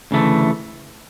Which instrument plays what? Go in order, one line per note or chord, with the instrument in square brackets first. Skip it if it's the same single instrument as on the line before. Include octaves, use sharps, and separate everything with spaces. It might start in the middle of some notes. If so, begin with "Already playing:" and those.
[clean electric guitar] D2 C#3 E3 A3